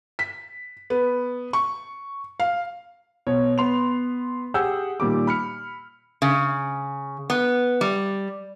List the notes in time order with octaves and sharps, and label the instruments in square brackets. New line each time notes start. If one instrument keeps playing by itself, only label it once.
[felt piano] B6
B3
C#6
F5
[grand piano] B2 C#5
B3 C6 F7
G4 G#4 F#5 E6 G6
A#2 D#3 G3 D6
B5 F6 C#7
[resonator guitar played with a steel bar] C#3
B3
G3